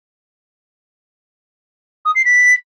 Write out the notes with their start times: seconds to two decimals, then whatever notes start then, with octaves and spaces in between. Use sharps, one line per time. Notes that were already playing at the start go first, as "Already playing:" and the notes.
2.05 D#6
2.15 C7
2.25 B6